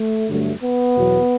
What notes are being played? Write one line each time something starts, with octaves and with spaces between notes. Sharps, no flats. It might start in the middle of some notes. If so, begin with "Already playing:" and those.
Already playing: A3
G2 D3 F#3 A3
B3
E2 B2 F#3